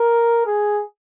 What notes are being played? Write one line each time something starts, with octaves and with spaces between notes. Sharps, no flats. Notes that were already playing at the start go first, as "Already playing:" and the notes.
Already playing: A#4
G#4